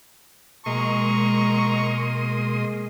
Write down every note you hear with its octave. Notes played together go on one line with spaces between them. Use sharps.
B2 G#3 A#3 A#5 C6 C#6 D#6